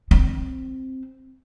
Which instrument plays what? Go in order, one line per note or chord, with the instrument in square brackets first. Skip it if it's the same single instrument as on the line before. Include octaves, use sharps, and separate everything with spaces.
[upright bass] C4